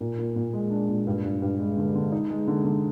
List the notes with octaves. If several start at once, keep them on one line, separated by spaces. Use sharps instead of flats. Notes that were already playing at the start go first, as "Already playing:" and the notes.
A#2
A#2
A#2
G#3
D4
A#2
G2
G2
G2
G#3
D3
D3
D#4
G#3
D3
D3